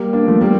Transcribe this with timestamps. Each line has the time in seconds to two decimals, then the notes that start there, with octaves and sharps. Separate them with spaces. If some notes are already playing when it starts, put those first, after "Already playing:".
Already playing: G3 A#3
0.13 A#3 D4
0.27 F3 A3
0.41 G3 A#3